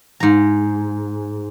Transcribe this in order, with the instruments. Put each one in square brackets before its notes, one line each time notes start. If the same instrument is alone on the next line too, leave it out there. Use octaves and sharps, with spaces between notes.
[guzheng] G#2 A#5